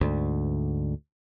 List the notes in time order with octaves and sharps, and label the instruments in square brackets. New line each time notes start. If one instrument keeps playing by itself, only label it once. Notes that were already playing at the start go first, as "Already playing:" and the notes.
[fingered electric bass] D2 G#2 D3